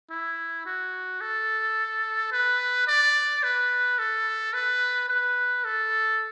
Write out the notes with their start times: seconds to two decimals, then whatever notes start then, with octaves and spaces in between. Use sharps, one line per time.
0.10 E4
0.66 F#4
1.21 A4
2.32 B4
2.88 D5
3.43 B4
3.99 A4
4.54 B4
5.09 B4
5.65 A4